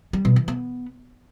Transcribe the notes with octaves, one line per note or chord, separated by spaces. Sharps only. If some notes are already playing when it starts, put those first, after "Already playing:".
G3
B2
E3
B3